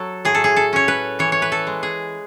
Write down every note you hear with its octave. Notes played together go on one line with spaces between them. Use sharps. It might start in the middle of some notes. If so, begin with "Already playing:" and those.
Already playing: F#3 A4
A2 G#4
A4
G#4
A4
C#4 C#5
B4
E3 C#5
C#5
B4
A4
G#3
G#4